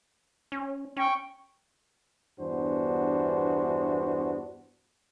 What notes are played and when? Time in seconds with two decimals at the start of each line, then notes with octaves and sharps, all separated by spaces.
0.52 C#4
0.97 C#4 G5 C#6
2.39 E2 G2 B3 D4 F#4 C5